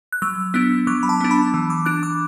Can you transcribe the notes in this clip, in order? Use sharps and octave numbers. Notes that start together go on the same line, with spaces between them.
F#6
F#3 E6
B3 D4 E6
F#3 D6
B5
A5
B3 D4
B5
E3
D6
D4 F#6
D6